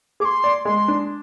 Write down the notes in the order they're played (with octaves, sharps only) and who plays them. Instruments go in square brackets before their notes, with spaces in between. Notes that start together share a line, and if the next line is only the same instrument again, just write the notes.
[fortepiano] G#4 [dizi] D6
[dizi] C6
[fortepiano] D5
[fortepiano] G#3 [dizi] C6
[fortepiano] D4